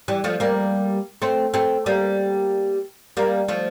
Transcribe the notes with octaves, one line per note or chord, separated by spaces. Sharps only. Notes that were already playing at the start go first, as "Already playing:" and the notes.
E3 G3
F3 A3
G3 A#3
A3 C4
A3 C4
G3 A#3
G3 A#3
F3 A3